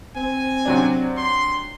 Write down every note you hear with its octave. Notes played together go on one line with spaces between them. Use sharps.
C4 G#5
C3 F#3 D4
C6